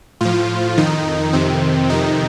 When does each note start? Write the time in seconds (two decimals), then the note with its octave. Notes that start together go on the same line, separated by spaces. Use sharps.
0.21 A2 F3 F4
0.77 F2 D#3 D#4
1.33 F2 C3 D#3 C4
1.89 F2 C3 D#3 D#4